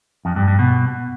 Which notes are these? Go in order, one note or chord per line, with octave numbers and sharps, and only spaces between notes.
F2
G2
G2
B2